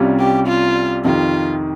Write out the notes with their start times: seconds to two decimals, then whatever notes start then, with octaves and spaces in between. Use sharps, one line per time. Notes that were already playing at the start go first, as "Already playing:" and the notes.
Already playing: C2 C3 G3 C#4 F4
0.19 G4
0.48 F4
1.04 F2 C3 D#3 F4